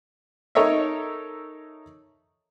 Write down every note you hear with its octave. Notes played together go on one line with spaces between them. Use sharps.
D#4 A4 A#4 C#5 D#5 E5